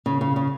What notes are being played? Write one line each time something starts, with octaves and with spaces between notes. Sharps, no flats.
C#3
C#3
C#3